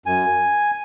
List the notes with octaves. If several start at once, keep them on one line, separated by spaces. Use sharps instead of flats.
F#2 G#5